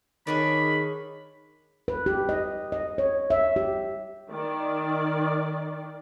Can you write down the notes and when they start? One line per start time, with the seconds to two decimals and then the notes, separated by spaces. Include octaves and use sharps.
0.27 D#3 D4 G#4 C#5 B5
1.88 B4
2.06 G4
2.29 D#5
2.72 D#5
2.98 C#5
3.30 E5
3.56 G4
4.30 D#3 D5